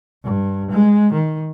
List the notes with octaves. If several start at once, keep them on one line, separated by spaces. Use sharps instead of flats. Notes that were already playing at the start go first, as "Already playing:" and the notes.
G2
G#3
D#3